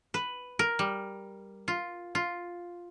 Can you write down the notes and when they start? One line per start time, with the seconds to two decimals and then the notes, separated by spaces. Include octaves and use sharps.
0.14 B4
0.59 A#4
0.79 G3
1.68 F4
2.15 F4